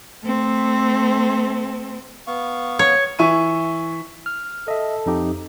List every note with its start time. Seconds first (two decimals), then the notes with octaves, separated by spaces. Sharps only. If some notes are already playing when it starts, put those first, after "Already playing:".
0.24 A3 C4
2.27 B3 F5 C#6
2.79 C#5
3.19 E3 E5 C#6 D#7
4.26 F6
4.68 A4 D#5 E5
5.06 F2 D#4 G4